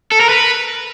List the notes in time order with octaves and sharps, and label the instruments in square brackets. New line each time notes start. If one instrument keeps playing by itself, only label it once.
[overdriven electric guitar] A4
A#4
B4